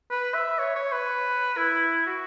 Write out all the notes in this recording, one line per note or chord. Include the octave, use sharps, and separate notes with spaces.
B4
E5
C#5
C#5
B4
E4
F#4